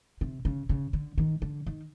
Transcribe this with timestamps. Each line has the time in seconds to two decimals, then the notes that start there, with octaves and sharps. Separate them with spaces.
0.21 C3
0.45 C#3
0.69 C#3
0.93 D3
1.18 D#3
1.42 D3
1.67 D#3